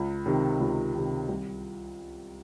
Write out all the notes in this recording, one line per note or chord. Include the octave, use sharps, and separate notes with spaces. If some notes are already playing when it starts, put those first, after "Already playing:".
Already playing: C#2
C3 D#3
C#2
C3 D#3
C2